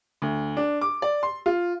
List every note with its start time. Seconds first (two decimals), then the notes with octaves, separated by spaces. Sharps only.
0.22 D2
0.57 D4
0.81 D6
1.02 D5
1.23 C6
1.46 F4